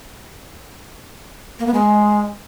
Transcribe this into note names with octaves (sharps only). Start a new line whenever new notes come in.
A#3
B3
G#3